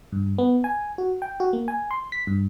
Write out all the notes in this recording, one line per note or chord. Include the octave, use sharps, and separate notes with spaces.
G2
B3
G#5
F#4
G5
F#4
A#3
G#5
C6
B6
G2